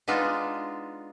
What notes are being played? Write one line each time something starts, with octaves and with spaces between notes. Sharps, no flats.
G#3 B3 D4 D#4 F4